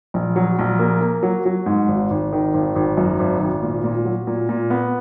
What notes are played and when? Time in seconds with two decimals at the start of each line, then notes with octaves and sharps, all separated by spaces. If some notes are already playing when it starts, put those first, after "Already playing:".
0.14 A#1
0.36 F#3
0.59 A#1
0.79 A#3
1.01 A#3
1.23 F#3
1.46 F#3
1.66 G#2
1.88 G#1
2.10 G#1
2.32 D#3
2.54 G#1
2.76 G#1
2.97 F#2
3.19 G#1
3.40 G#1
3.63 A#2
3.84 A#2
4.05 F#3
4.27 A#2
4.49 A#2
4.70 B3